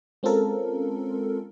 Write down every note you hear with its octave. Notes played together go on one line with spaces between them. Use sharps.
G#3 C4 C#4 F4 A4 A#4